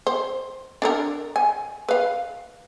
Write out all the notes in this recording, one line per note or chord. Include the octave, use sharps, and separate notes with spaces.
C5
D4 A4 A#4
G#5
B4 F5